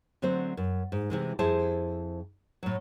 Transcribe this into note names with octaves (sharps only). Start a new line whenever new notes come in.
D3 F#3 A3 C4 C5
F#2
G#2
C3 E3 G#3
F2 E4 G#4 C5 A5
A2 F#3